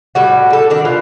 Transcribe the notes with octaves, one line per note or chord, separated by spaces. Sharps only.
A2 G3 F#4
G3 A4
D#3 D4
B2 F4 F5